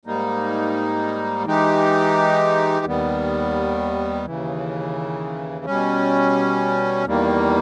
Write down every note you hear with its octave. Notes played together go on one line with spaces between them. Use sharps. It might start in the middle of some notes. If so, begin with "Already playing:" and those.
G#2 G3 A#3 D#4
E3 G#3 D#4 G4
D#2 D#3 G3 B3
D#2 C#3 E3
B2 G3 C#4
E2 D#3 G3 A#3